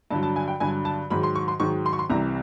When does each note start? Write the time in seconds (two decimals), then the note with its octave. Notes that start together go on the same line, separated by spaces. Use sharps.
0.10 G2 D3 F#3 A5
0.23 A5
0.36 G#5
0.48 G5
0.60 G2 D3 F#3 G#5
0.85 A5
1.10 G#2 D#3 F#3 B5
1.23 C6
1.35 C#6
1.48 C6
1.60 G#2 D#3 F#3 C#6
1.86 C6
1.93 C#6
1.99 C6
2.10 C2 C3 E3 A#5